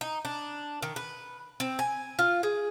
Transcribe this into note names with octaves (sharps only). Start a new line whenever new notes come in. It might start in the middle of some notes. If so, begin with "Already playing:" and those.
D#4
D4
D#3
B4
C4
G#5
F4
G#4